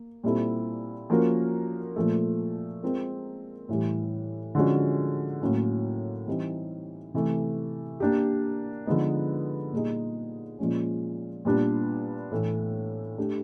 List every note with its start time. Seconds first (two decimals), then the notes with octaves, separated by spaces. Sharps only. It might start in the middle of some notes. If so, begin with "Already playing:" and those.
Already playing: A#3
0.23 A#2 G3 C4 E4 A4
1.10 F3 A#3 C#4 F#4 A#4
1.96 A#2 F3 A3
2.83 G#3 C4 F4 A#4
3.69 A2 E3 G3
4.55 D3 F3 G#3 C#4 F#4
5.42 A2 F#3 A#3 C#4
6.28 E3 G3 C4 D#4
7.14 C3 E3 A3
8.00 A#3 D4 G4
8.86 D3 F3 G#3 B3 D#4
9.73 A#2 G3 A#3 D#4 G#4
10.59 A#2 F3 G#3 C#4
11.45 A#2 G3 B3 D4
12.31 A2 E3 A3
13.18 A3 D4 G4